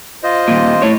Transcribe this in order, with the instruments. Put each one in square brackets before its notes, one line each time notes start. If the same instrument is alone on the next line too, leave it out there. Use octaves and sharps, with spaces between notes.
[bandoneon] F4 C5 D#5
[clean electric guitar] D#2 A#2
A2 C#5